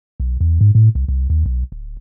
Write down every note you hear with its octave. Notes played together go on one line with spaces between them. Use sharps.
B1
E2
G#2
A2
C2
C2
D#2
B1
D1